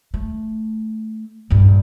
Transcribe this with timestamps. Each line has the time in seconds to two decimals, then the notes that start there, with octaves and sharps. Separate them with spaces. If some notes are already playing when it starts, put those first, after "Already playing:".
0.14 A3
1.50 A#1 G2